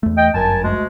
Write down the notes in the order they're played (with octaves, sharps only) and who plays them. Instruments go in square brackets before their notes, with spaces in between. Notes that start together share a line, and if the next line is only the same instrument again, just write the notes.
[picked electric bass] E2 A3
[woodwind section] D#5 G5
[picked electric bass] G1 F#2 [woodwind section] A#4 G#5 A5
[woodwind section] D2 B2 G#3